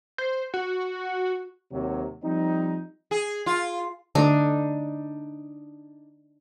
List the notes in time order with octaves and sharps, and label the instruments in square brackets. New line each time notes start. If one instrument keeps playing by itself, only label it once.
[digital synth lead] C5
F#4
[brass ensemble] D#2 C3 F#3
F3 G3 C4 D#4
[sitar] G#4
F4
[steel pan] D3 A3 [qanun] D4 D#4